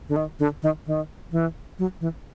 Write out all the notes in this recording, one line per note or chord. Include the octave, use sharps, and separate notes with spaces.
D3
D#3
D3
D#3
D#3
E3
F#3
E3